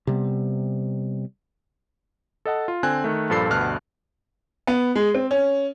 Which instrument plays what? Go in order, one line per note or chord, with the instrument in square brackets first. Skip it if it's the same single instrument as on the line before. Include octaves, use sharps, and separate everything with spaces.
[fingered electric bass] C3 G3 B3
[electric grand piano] A4 D#5 F#5 A5
F4
D3 C4 G#5 F#6
D#3 A3
G2 A#2 F3 A4 B5 C7
D2 G2 B2 A5 F6 F#6
[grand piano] B3
G#3
C4
C#4